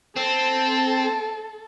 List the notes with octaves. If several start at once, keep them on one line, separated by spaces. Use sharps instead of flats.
C4 A4